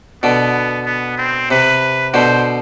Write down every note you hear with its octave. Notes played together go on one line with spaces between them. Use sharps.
B2 D3 B3
B3
C4
C3 B4
B2 D3 C5